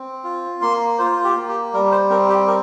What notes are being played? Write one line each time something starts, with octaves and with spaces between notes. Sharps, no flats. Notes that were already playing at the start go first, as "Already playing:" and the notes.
Already playing: C4
F4
A#3 C6
F4 C5
G4
A#3
G4
G3 A#4
C5
C4 A#4
G4
A#4